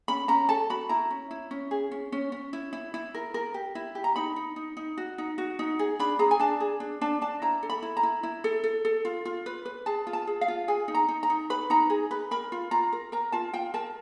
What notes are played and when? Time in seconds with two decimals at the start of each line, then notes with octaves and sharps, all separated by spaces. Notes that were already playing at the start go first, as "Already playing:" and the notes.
0.08 C#4 B5
0.28 C#4 A#5
0.49 A4 A5
0.70 F#4 B5
0.89 E4 A#5
1.10 C#4
1.31 E4
1.51 C#4
1.71 G#4
1.91 C#4
2.12 C#4
2.32 C#4
2.53 E4
2.73 E4
2.94 E4
3.15 A#4
3.34 A#4
3.54 G4
3.75 E4
3.95 G4
4.04 A#5
4.16 D#4 B5
4.36 D#4
4.56 D#4
4.77 D#4
4.98 F#4
5.18 D#4
5.38 F#4
5.59 D#4
5.79 G#4
5.99 D4 B5
6.19 G#4 A#5
6.31 G#5
6.39 D4 A5
6.60 G#4
6.80 D4
7.01 D4 A5
7.21 D4 A5
7.42 E4 A#5
7.63 A4
7.70 B5
7.82 E4
7.97 A#5
8.03 E4
8.23 E4
8.44 A4
8.64 A4
8.85 A4
9.05 F4
9.25 F4
9.46 B4
9.65 B4
9.86 G#4 A5
10.07 F4
10.13 A5
10.27 G#4
10.41 F5
10.48 F4
10.68 G#4 G#5
10.88 D#4
10.95 A#5
11.08 D#4
11.23 A#5
11.30 D#4
11.50 B4 B5
11.70 D#4 A#5
11.90 G#4
12.11 B4
12.31 A#4 B5
12.52 F4
12.71 F4 A#5
12.93 A#4
13.12 A#4 A#5
13.32 F4 A5
13.54 F4 G5
13.74 A#4 A5